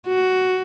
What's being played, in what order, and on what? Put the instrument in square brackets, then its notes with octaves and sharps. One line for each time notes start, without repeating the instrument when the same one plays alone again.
[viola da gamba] F#4